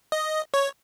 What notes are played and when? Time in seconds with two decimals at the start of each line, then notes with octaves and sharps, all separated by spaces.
0.12 D#5
0.54 C#5